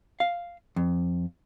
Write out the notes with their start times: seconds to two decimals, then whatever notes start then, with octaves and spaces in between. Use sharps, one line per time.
0.20 F5
0.76 F2